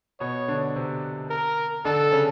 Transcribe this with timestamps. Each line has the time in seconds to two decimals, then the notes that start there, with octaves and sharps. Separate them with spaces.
0.20 B2 B3 C#5
0.48 D3 D4
0.75 C3 C4
1.30 A#4
1.85 D3 D4 A4
2.12 C#3 C#4